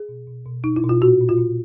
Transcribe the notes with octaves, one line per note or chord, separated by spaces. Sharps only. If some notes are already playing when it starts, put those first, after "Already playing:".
Already playing: G#4
B2
B2
B2
B2 D#4
E4
B2
F4
A#2 F#4
A#2
F4
A#2